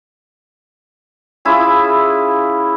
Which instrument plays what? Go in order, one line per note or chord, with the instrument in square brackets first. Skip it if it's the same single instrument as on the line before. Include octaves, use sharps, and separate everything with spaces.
[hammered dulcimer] C#4 E4 F4 G#4